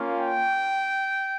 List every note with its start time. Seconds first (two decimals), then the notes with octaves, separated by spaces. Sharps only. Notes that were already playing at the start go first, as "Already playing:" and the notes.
Already playing: A#3 C#4 F4
0.19 G5